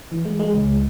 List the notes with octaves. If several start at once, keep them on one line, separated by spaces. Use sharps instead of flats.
E3
G#3
G#3
C#2